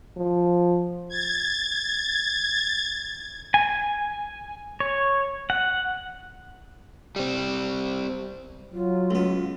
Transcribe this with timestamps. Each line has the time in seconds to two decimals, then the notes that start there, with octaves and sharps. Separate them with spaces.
0.17 F3
1.09 G#6 A6
3.54 G#5
4.80 C#5
5.50 F#5
7.16 G3 C4
8.73 F#3 F4
9.10 C#2 B3